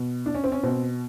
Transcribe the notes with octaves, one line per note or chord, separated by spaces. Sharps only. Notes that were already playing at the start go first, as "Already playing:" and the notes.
Already playing: B2
D4
C#4
C4
C#4
B2 C4